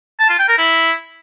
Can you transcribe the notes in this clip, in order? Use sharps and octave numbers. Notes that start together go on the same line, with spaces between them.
A5
F4
G5
A#4
E4